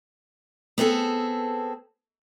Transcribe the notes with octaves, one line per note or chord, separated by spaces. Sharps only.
B3 C4 G#4 A4